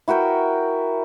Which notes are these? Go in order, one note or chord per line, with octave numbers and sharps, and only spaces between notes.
E4 F#4 A#4 G5